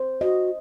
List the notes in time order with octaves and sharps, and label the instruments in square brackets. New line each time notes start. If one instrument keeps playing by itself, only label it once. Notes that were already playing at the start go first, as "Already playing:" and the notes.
Already playing: [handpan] C5
[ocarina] F#4 [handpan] D#5